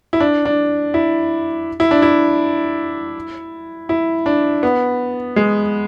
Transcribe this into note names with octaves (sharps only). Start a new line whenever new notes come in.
E4
D4
D4
E4
E4
D4
E4
E4
D4
B3
G#3